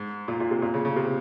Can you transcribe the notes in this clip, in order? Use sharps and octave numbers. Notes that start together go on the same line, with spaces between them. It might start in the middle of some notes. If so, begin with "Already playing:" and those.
Already playing: G#2
A#2
A#2
C3
A#2
C#3
C#3
C3